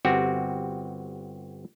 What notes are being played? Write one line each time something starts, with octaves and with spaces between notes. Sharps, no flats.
G1 C4 F#4 G4